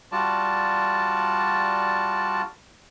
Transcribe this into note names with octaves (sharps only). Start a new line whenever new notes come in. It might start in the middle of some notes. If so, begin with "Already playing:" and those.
G3 F4 F#4 D5 A5